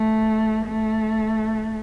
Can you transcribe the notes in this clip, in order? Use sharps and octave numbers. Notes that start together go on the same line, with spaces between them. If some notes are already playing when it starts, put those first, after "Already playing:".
Already playing: A3
A3